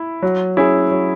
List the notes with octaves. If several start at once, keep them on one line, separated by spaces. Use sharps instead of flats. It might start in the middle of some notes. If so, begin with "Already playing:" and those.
Already playing: E4
F#3
C#4 E4 G#4
F#3